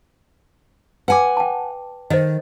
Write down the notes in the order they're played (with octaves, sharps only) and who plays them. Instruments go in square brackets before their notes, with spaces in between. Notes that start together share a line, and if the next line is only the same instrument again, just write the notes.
[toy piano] B4 D6 [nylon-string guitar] F#5 G#5
[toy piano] G5 A5
[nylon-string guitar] D#3 [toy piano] C5 D#5